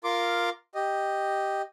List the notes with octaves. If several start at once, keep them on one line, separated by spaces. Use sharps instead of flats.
F4 A#4 C6 D6
G4 D#5